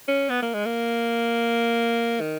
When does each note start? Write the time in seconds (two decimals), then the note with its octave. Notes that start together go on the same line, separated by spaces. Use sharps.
0.08 C#4
0.30 B3
0.42 A#3
0.54 G#3
0.66 A#3
2.21 D#3